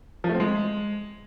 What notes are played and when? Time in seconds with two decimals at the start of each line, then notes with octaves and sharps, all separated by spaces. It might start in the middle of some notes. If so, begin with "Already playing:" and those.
0.24 F3
0.29 A3
0.35 C4
0.40 G#3